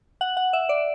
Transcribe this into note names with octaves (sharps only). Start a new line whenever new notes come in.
F#5
F#5
E5
D5